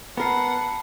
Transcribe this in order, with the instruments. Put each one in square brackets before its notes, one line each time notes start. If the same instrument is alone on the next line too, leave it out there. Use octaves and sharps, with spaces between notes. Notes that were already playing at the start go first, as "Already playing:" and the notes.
[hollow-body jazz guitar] B3 A#4 [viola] F#5 [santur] A5 E6 [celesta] B5 C7